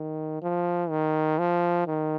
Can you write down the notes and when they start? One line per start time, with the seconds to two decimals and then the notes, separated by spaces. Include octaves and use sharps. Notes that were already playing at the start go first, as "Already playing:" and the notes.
Already playing: D#3
0.42 F3
0.90 D#3
1.39 F3
1.87 D#3